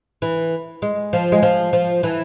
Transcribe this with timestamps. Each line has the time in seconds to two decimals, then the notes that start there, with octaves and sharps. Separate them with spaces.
0.22 E3
0.82 G#3
1.13 F3
1.32 G#3
1.43 F3
1.73 F3
2.03 E3